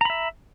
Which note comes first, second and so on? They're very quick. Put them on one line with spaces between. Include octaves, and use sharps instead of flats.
A#5 B5 E5